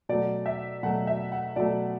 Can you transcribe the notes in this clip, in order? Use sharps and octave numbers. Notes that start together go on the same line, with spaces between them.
B2 F#3 A3 D5
E5
B2 F#3 A3 F#5
E5
F#5
B2 F#3 A3 D5